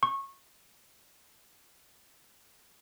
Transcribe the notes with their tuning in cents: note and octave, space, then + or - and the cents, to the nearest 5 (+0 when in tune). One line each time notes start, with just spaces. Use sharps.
C#6 -20